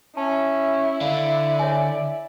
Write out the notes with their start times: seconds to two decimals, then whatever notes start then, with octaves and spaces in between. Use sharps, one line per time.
0.17 C#4 E4 A5
1.01 D3 D5 F5
1.59 C#5 E5 G#5